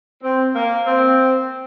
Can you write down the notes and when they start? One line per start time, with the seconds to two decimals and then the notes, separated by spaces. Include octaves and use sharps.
0.21 C4
0.55 A#3
0.86 C4